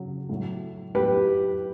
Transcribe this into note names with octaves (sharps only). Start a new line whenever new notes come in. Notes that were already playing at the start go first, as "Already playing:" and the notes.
Already playing: C#3 F#3
A2 F#3
A2 F#3 G4 B4